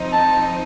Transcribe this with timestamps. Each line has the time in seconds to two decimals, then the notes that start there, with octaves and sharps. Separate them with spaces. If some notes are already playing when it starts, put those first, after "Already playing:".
Already playing: F3 C4 D#4
0.13 A5